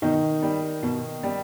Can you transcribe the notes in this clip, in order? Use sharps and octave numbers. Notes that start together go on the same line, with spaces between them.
B2 D#3 D#4
G3
B2
G3